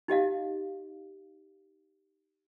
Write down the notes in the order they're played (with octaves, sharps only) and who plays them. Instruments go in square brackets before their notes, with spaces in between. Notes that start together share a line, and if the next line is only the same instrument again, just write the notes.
[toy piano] D#4 G4 D#5 F5